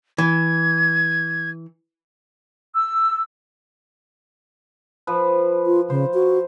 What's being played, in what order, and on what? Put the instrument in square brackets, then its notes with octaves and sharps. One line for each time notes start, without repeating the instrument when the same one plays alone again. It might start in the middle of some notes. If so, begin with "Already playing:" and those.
[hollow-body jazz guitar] E3 [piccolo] G#6
[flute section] E6
[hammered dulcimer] F3 B4
[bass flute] F4
[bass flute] C#3 [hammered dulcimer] C5
[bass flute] F#4